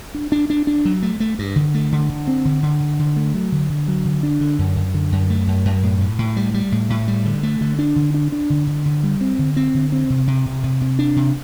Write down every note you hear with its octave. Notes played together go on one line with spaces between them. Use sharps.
D4
D4
D4
D4
F#3
A3
A3
G2
D3
A3
D3
D3
C4
D3
D3
D3
D3
A3
F#3
D3
D3
F#3
D3
D4
D3
F#2
F#2
D3
F#2
A3
F#2
F#2
A2
A2
A2
G3
G3
A2
A2
G3
D3
A3
D3
D4
D3
D4
D4
D3
D3
D3
G3
C4
D3
C4
D3
C4
C3
C3
C3
C3
C3
D4
C3